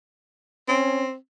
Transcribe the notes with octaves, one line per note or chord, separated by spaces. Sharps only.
C4 C#4